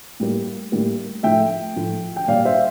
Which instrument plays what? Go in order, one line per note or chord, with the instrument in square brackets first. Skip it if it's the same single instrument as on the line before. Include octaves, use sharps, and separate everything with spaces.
[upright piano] A2 G3 A#3
A2 G3 A#3
A2 F3 A3 E5 G5
A2 F3 A3
G5
A#2 G3 A#3 D5 F5
C5 E5